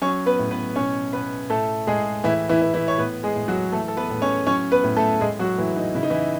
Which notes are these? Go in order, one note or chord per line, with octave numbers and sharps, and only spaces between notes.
F#3 C#4 C#5
B3 B4
A2
B3 B4
B2 C#4 C#5
B2 B3 B4
A2 A3 A4
A2 G#3 G#4
A2 E3 E4
E3 E4
E3
E3 E4
C#5
A2 B3 B4
G#3 G#4
A2
F#3 F#4
E3 A3 A4
A4
B3 B4
A2
C#4 C#5
F#3 C#4 C#5
B3 B4
A2
A3 A4
A2 G#3 G#4
F#3 F#4
A2 E3 E4
D#4
C#3 E4
D#4
E3 E4